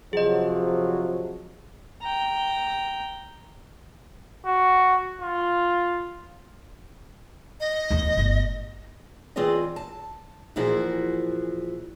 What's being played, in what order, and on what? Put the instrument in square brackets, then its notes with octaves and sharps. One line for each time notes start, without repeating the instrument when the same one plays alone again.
[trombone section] C3 F3 F#3 [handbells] G#4 D#5
[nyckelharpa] G5 A#5
[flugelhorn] F#4
F4
[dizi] D#5
[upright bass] D1 E2
G1 A2
[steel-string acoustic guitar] E3 C4 F4 G#4 D5 D#5
A5
A#2 E3 F3 E4 F#4 G#4